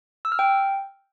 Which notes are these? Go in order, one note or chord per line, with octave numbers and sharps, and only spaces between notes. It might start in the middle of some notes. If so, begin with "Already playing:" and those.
E6
F6
G5